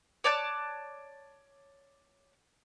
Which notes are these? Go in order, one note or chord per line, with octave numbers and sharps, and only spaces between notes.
C#5 D5 A5 F#6